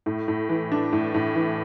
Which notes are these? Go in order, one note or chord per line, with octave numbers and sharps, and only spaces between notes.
A2
A2
E3
D4
A2
A2
E3